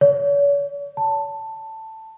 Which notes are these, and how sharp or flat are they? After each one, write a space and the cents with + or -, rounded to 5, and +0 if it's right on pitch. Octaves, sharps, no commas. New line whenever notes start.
C#5 +40
A5 +10